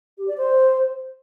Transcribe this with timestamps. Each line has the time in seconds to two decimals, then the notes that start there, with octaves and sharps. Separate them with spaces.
0.18 G4
0.28 D5
0.37 C5